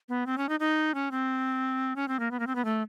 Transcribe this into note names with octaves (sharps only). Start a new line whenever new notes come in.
B3
C4
C#4
D#4
D#4
C#4
C4
C#4
C4
A#3
B3
A#3
C4
B3
A3